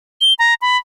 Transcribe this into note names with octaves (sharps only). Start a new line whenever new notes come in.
G7
A#5
B5